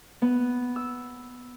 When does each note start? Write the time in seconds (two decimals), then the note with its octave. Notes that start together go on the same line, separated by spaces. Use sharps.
0.22 B3
0.76 E6